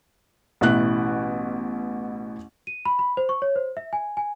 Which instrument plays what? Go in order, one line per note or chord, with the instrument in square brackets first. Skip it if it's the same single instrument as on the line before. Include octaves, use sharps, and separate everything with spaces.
[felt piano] A1 B2 E4 F#6
[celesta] D#7
B5
B5
C5
C#6
C#5
C5
E5
G#5
G#5